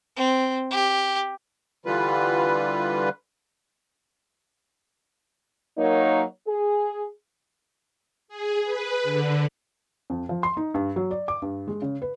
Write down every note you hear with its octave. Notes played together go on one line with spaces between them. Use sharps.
C4
G4
D3 E3 G3 F4 B4
F#3 A#3 D#4 A#4 C#5
G#4
G#4
B4
D3
F2
F3
C6
D#4
G2
F#3
D5
D6
G2
G#3
C#3
B4